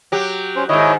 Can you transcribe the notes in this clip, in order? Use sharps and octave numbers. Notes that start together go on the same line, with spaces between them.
F#3 G4
C#4 C5
G#2 D#3 E4 C#5 D#5